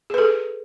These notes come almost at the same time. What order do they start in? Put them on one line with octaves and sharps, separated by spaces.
G#4 B4 A4